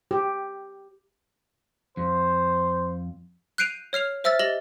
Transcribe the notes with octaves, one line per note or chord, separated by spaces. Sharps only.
G4
F2 C5
F#6 G6 C7 D7 D#7 F7
C#5 F6 C7 F7
C5 E5 E6 F6 A6
G4 D#5 A6 A#6 F#7 G7